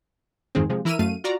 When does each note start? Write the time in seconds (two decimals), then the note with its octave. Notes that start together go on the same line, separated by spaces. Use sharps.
0.55 F2 G#2 D#3 G#3 C4
0.69 C3 F3 G#3
0.85 E3 E4 A#4 E6 F6 D#7
0.99 F#2 A3 F5 D#7
1.24 F4 F#4 D5 A#5